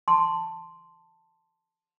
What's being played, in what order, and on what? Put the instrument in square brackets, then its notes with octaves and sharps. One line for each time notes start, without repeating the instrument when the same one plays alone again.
[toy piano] A5 C6